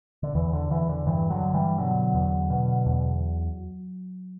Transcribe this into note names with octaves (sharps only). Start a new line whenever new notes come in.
D3
E2 E3
D3
E2 E3
D3
G2 E3
D3 F#3
G2
E3 G3
B2 D3 F#3
E2
B2
E2